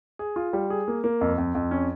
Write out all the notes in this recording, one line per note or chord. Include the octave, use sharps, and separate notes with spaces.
G#4
F4
G3
G#4
A#3
A#3
F2
F2
F2
C#4